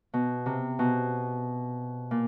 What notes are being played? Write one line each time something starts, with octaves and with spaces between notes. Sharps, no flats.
B2
C3
B2
A#2